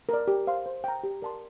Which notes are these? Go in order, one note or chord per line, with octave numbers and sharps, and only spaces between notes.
A#4 D5
G4
C5 F5 C6
C5
G5 A#5
G4
A#4 D5 A5 C6